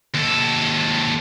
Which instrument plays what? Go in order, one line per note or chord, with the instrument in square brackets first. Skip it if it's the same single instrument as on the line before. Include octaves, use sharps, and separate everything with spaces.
[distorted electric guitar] D#2 A4